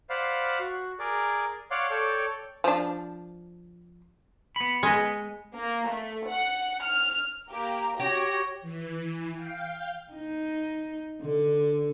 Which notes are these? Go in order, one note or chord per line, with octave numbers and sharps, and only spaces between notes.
C5 D5 F5 F#5 B5
F#4
G#4 A#4 D5
C#5 D5 F5 F#5 C6 D6
A4 C#5 D5 G5
F3 D4
B3 B5
G#3 D#5
A#3
A3
F#5
F6
A#3 G4 A#4
F#4 G4 C#5 G5 A#6
E3
F5 G5
D#4
D3